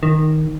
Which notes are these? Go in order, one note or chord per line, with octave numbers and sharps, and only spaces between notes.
D#3